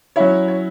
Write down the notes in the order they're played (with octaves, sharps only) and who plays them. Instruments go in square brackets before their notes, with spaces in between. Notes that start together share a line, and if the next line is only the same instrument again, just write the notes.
[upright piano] F#3 C#4 E4 C#5
C#5